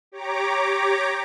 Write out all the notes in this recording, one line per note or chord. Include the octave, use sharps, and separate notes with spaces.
G4 C#5 A#5 D6